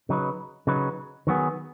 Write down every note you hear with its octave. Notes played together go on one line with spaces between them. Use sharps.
C#3 F#3 D#4 B4
C#3 F#3 D#4 B4
D#3 F#3 B3 G#4